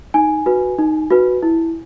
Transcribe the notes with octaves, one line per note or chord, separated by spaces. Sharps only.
D#4 G#5
F#4 B4
D#4
F#4 B4
E4